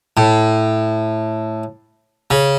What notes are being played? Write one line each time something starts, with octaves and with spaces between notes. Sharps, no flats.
A2
C#3